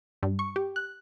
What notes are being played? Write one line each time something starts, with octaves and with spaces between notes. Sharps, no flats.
G2
C#6
G4
F#6